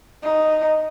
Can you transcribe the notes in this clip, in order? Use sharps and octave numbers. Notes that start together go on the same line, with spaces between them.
D#4